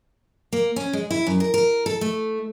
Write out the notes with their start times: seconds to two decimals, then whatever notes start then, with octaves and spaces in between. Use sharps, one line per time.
0.53 A#3
0.76 C#4
0.93 G#3
1.11 E4
1.27 F#2
1.40 A#4
1.54 A#4
1.86 A4
2.01 A3